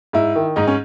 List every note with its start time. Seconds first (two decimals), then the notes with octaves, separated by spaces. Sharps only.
0.13 G#2 E4
0.36 D#3
0.56 G#2 D#4
0.67 C#4